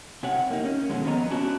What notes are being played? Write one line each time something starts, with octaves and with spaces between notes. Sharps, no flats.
C3 G4 C#5 F#5
A#3 D#4
C#4
B2 D3 D#3 F#3 G#3
F2 B3 C#5 D#5 A#5
C#4 D4 F#4